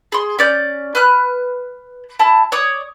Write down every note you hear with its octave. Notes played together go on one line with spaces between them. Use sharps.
G#4 C6
C#4 D5 G6
B4 F6 F#6
E4 A5
C#5 D5 D#6